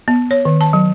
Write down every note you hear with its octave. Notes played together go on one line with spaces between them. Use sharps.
B3
C#5
D#3
A5
F#3